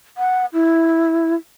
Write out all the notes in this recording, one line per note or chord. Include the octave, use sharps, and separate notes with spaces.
F#5
E4